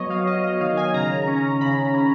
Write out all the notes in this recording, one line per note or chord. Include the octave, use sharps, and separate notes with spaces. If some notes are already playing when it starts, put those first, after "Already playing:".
Already playing: F#3 B3 C#5 D#5
F5
F#3 D#5
D#5
D#3 F5
G#5
C#3 A#5
C#4
C#3 B5
C#4